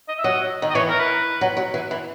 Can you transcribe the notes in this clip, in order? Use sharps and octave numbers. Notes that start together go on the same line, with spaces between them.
D#5
E5
F#3 D#5
D#3
D#5
E3 C#5
A#4
B4
F#3
F#3
E3
E3